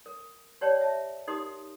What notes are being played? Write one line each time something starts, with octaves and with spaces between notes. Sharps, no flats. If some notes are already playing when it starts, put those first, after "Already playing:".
A#4
G4 B4 C#5 D5 G5 A5
E5 A5
D#4 G4 A#4 C6 D#6